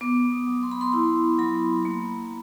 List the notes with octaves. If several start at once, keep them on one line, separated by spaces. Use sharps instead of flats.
B3 D6
D#6
F#3
C6
B5
C6
E4 C6
F#3 B5
A#3